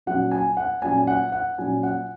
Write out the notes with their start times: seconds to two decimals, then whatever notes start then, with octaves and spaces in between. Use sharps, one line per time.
0.06 A#2 F#3 C#4 F#5
0.31 G#5
0.57 F#5
0.82 A#2 F#3 C#4 G#5
0.97 G#5
1.07 F#5
1.32 F#5
1.58 A#2 F#3 C#4 G#5
1.83 F#5